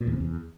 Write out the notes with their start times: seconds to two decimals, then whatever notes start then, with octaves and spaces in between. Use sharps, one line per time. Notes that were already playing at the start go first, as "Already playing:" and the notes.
0.01 A#2
0.07 E2
0.14 C3
0.20 E2